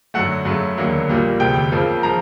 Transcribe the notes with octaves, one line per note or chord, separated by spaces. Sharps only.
F#2 D3 F#3 A3 F#5
F#2 C#3 F#3 A3
E1 D#2 D3 F#3 A#3
A#1 A#2 G3 A#3
E1 D2 C3 G5
F2 C#3 F3 A#3
C#3 F3 A#5